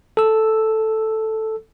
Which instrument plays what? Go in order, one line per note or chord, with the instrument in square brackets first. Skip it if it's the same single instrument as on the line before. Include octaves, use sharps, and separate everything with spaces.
[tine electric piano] A4 E6